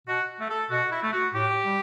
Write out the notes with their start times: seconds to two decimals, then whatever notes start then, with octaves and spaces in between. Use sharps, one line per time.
0.08 B2 F#4
0.40 A3
0.49 A4
0.70 B2 F#4
0.92 E4
1.02 A3
1.13 F#4
1.34 A2 G4
1.65 G3